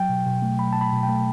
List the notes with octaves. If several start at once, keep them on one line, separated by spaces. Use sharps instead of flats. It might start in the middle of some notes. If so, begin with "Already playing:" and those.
Already playing: F#3 G5
B2
B2
A3
F#3 B5
B2 A5
B5
B2
G5
A3